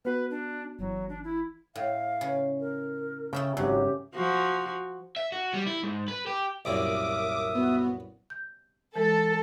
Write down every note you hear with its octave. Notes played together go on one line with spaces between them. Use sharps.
B3 F#4 B4
D4
G1 E3 F#3
D4
E4
A2 F5
C#3
A#4
C#3 A3 E5 G5
G#1 C#3 F#3 G4
F3 F#4
E5
F#4
G3
E4
G#2
B4
G4
C2 F#2 A#2 A#4 E5 D6 D#6
B3 F#4
G6
E3 G#3 A4